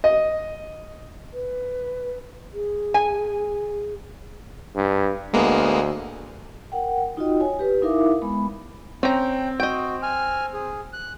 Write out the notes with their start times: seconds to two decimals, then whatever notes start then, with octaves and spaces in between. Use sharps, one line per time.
0.04 D#5
1.33 B4
2.53 G#4
2.94 G#5
4.76 G2
5.33 D2 G#3 A#3 B3
6.72 A#4 F#5 G5
7.17 D#4 F4 F#4 D#5 G5
7.40 C#5 G#5
7.59 G4 B4
7.82 D#4 E4 A#4 E5 F5 D6
8.22 G#3 B3 B5
9.03 C4 C#4 G5 A#5
9.60 F#4 D#5 G5
10.02 G#5 F6
10.53 G#4
10.93 F#6